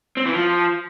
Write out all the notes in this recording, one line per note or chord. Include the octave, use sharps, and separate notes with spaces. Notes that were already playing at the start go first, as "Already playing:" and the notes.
C4
E3
F3